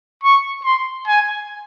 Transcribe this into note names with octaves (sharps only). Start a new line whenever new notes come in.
C#6
C6
G#5